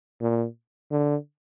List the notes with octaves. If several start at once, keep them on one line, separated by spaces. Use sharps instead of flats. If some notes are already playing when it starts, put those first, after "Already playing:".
A#2
D3